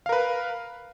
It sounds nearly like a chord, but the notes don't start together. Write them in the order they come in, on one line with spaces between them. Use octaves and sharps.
F5 A#4 B4